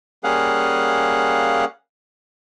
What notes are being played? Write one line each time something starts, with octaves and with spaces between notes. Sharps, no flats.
G3 A#3 C#4 G#4 F5 F#5